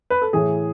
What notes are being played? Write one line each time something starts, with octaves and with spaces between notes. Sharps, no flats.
B4
A4
A2 E3 G#4